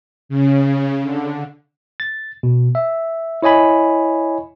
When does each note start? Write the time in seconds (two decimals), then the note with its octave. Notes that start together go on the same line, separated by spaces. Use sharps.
0.29 C#3
1.02 D3
2.00 A6
2.43 B2
2.75 E5
3.42 E4 C#5 D#5 G#5 B5